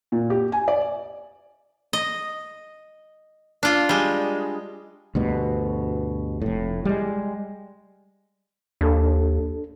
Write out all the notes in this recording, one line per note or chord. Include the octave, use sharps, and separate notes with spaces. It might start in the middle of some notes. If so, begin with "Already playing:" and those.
A#2
G4
G#5
D5
D#5
D4 F4
G3 G#3
D2 G2 B2
F1 A2
G3 G#3
D#2 D4 A4